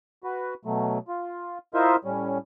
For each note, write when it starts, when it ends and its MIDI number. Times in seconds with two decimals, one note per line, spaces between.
0.24 0.54 66
0.24 0.54 71
0.65 0.98 47
0.65 0.98 54
0.65 0.98 57
1.08 1.58 65
1.74 1.96 64
1.74 1.96 65
1.74 1.96 70
1.74 1.96 72
1.74 1.96 75
1.74 1.96 76
2.05 2.38 45
2.05 2.38 55
2.05 2.38 61